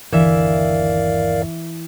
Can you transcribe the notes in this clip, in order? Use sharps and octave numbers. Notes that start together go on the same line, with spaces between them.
G1 D#2 D3 E3 A#4 D5 E5 F5